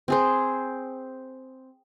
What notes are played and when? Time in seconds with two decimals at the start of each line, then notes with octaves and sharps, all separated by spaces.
0.08 C4 G#4 C5